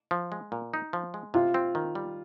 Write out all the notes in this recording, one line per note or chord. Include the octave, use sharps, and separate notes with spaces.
F3
G#3
A#2
D#4
F3
G#3
C3 F4
C4
D#3
G3